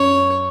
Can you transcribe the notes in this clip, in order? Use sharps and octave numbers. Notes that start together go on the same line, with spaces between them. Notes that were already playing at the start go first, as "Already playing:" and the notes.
Already playing: F#2 C#5